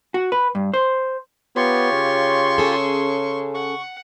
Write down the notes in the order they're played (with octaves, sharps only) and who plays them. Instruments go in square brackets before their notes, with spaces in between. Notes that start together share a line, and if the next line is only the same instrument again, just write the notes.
[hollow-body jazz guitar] F#4
B4
G2
C5
[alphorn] B3 [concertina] F4 G4 C#5 [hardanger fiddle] C6 C#6
[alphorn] C#3
[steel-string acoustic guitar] C#4 G#4 A4
[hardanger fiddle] F#5 [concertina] C#6